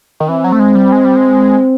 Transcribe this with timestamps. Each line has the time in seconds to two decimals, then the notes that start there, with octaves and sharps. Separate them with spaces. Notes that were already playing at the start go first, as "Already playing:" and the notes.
0.20 D#3
0.29 E3 C4
0.44 F#3
0.52 A3
0.59 G#3
0.75 G3
0.92 G#3
1.05 G3
1.16 G#3